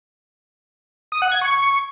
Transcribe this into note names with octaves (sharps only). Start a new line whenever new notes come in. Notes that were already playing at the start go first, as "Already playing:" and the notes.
D#6
F#5
G#6
C#6